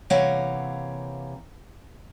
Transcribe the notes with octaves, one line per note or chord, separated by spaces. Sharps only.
C3 E3 A#3 C#5 F5 F#5